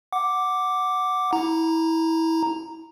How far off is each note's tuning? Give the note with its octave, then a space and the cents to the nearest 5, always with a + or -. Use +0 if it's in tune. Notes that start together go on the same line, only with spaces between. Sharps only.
F#5 +0 D6 +0
E4 -20 A#5 +0